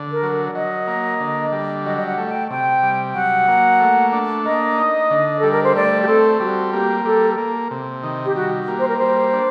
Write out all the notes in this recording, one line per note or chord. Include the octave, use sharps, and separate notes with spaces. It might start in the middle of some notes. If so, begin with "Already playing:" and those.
Already playing: D3
A#4
F#3
F#3 D#5
A#3
D3
G3
F#3 D#5
D#5
F#5
A3
G5
C3 G5
G3
F#3 F#5
A#3
A3
D4
A#3 D#5
D#4
D3
G3 A4
A#4
C5
A3 D5
G4
C4 A4
G3 F#4
A#3 G4
G3 A4
A#3
C3
D#3
G4
G3 F#4
A#3
C5
A#4
G3 C5
D4